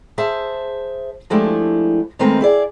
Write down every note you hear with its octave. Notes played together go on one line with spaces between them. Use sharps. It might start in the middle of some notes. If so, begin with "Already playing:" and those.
G#4 C5 E5 A5
F3 G#3 A3 D4 E4 G4
D#3 G#3 A3 C4 A#4 B4
E4 G#4 D5